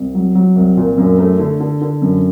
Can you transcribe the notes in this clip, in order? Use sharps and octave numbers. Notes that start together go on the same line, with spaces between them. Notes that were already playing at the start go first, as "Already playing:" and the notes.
Already playing: C2
F#3
F#3
C2
A#2
F#2
A3
D3
D3
D3
F#2